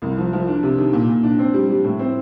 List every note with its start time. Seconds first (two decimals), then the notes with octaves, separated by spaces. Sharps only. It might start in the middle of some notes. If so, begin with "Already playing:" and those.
0.02 C2
0.17 F3
0.33 F3
0.48 D4
0.63 C3
0.78 D#3
0.93 A#2
1.09 A#2
1.23 D4
1.39 C4
1.54 G3
1.69 G3
1.84 A2
1.99 C4